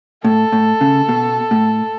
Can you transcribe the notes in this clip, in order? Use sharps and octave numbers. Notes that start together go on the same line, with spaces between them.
A2 A4
A2
C#3
B2
A2